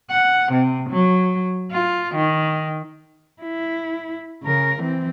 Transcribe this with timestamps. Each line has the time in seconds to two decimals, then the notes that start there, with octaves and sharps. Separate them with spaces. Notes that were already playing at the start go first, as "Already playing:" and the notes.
0.10 F#5
0.53 C3
0.90 F#3
1.72 F4
2.15 D#3
3.42 E4
4.44 C#3 A#4
4.80 E3 C4